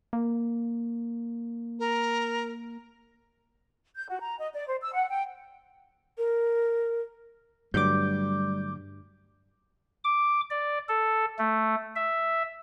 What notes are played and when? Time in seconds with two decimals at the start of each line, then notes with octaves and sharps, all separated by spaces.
0.13 A#3
1.79 A#4
3.96 G6
4.09 F#4
4.21 A#5
4.38 D#5
4.54 D5
4.67 C5
4.82 E6
4.94 F#5
5.10 G5
6.18 A#4
7.74 G2 D3 F#3 G3 A3 D6 G6
10.04 D6
10.50 D5
10.89 A4
11.39 A3
11.96 E5